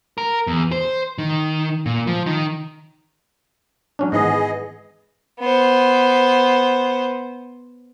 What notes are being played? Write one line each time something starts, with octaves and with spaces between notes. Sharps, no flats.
A#4
E2
C5
D#3
A#2
F3
D#3
F#3 C#4 D4
G#2 D#3 E3 B3 G#4 D#5
B3 C5